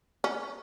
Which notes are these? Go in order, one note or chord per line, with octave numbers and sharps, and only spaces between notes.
C#4